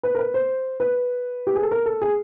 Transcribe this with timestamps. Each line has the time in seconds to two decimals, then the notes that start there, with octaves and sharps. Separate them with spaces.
0.03 B4
0.15 A#4
0.19 B4
0.34 C5
0.80 B4
1.47 G4
1.55 G#4
1.63 A4
1.71 A#4
1.86 A4
2.02 G#4